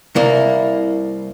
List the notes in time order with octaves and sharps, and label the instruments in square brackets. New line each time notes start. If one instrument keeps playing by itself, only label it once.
[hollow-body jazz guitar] C2 A#3 [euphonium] E4